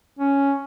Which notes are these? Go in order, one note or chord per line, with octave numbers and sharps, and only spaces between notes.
C#4